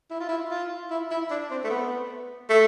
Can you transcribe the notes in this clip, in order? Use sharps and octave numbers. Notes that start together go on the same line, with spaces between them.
E4
F4
E4
F4
E4
E4
D4
C4
A3
B3
A3